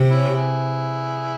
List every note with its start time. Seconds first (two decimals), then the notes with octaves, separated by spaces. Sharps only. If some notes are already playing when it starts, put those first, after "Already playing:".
Already playing: C3
0.10 C#4 E4
0.34 E4 G#4